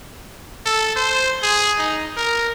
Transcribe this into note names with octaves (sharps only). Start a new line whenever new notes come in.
A4
C5
G#4
D#4
A#4